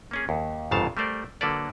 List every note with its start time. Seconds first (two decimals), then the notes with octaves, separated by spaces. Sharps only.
0.11 A#3 C#4 G#4
0.29 D#2
0.71 G1 F2 G#2 C#3 F5 A5
0.97 G3 A3 A#4 C5 D5
1.41 D3 F#3 A#3 A4 B4 D5